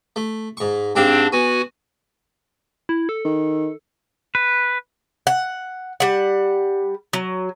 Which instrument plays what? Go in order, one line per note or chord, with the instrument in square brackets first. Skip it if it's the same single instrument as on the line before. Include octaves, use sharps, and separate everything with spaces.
[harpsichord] A3
G#2 C#6
[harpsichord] G#2 G4 F5 [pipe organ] C4 D4
[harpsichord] B3 [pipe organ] F#4 G#5
[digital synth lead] E4
A4
[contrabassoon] D#3
[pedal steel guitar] B4
[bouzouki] F#5
G3 F#5
F#3